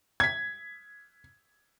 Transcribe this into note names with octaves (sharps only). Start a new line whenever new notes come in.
G#6 B6